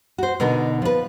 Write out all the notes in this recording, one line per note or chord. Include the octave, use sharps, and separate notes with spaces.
F#4 C5
B2 D3 D#4 A#4
F3 B4